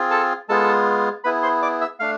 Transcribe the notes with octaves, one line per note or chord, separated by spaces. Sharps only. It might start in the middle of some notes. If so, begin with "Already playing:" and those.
Already playing: C4 F4 G#4
A4 A5
G#3 B3 F4 G#4 A4 A5
B3 E4 G#4 B4 B5
C5 C6
D5 D6
E5 E6
A3 D4 F5 F6